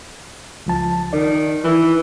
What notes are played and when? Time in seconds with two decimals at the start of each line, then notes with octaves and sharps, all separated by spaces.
0.66 C#2 F3 A5
1.13 D#3 D5
1.64 E3